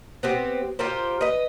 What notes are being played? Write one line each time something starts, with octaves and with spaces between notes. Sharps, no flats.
B3 C4 G4
F4 G4 A#4 C5
B4 D#5